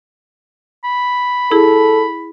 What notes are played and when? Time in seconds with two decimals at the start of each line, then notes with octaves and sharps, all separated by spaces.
0.84 B5
1.51 E4 G#4 A4